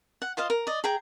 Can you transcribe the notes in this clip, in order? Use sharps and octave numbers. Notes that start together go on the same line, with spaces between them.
F#5
F4 C5 D#5 F5
A#4
D5 D#5
G#4 G5 A#5